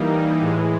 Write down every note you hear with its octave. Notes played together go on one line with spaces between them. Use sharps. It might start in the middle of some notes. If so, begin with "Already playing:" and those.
Already playing: E3 G3 A#3 D#4
A2 E3 G#3